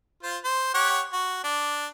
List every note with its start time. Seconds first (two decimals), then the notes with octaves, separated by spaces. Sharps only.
0.23 F4 C5
0.44 C5
0.74 G4 C#5 F#5
1.13 F#4
1.44 D4